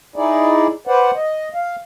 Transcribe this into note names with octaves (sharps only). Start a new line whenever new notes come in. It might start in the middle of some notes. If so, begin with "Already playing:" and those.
D#4 E4 G#4 D5
B4 C5 D5 F#5
D#5
F5